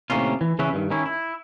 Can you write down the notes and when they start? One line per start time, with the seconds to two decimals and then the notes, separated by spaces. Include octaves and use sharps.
0.10 A2 C3 D#3 A#3 C#4 F4
0.41 E3
0.59 C#3 E3 C#4 B4 E5
0.73 G2 D#3
0.91 D#3 C#4 E4
1.06 E4